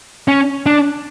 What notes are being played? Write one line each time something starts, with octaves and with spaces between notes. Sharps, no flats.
C#4
D4